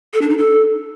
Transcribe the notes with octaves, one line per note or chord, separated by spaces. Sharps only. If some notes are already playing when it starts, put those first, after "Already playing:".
A4
D4
D#4
A4